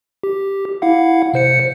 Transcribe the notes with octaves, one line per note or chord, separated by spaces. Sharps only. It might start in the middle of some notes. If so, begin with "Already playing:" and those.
G4
E4 F5 F#5
C3 C5 C#7